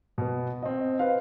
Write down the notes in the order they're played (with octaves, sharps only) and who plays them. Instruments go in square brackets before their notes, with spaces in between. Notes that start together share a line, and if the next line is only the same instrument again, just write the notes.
[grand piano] B2 B3
C4 D#5
B4 C5 F5